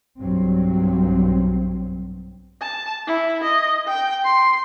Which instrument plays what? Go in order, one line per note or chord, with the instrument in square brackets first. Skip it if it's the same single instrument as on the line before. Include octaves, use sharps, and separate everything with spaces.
[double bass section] B1 G2 F#3 C4
[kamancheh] A5
E4
D#5
G5
C6